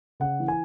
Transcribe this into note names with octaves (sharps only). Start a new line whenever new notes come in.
C#3 F#5
E3
G#5